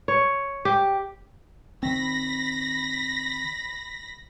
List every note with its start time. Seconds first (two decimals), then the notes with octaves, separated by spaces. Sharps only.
0.08 C#5
0.65 G4
1.83 D#3 C4 B5 A#6 B6